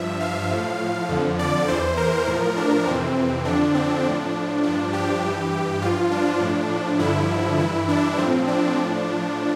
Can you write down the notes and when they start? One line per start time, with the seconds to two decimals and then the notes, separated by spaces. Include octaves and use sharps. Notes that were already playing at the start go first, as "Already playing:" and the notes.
Already playing: G2 F3 E5
0.20 F5
0.51 A2 F3
1.09 F2 D3 F3
1.39 D5
1.68 E2 E3 C5
1.97 A#4
2.27 A2 F3
2.57 D4
2.86 F2 C3 E3 C4
3.16 C4
3.45 F2 D3 F3 D4
3.75 C4
4.04 A2 F3 D4
4.63 G2 F3 D4
4.93 G4
5.22 G2 E3
5.82 G2 F3 F4
6.11 D4
6.41 A2 F3
6.99 G2 D3 F3 E4
7.59 G2 E3 E4
7.89 D4
8.18 A2 F3 C4
8.47 D4
8.78 A2 F3